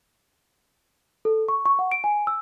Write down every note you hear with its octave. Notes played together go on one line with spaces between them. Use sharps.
A4
C#6
C#6
F#5
D7
G#5
E6